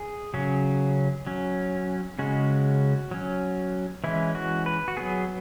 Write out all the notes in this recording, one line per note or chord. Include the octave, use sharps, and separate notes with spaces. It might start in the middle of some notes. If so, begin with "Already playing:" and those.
Already playing: G#4
C#3 F#3 C#4
F#3 C#4
C#3 G#3 C#4 F#4
F#3 C#4
E3 G#3 C#4 E4
F#4
B4
F#4
F#3 B3 G#4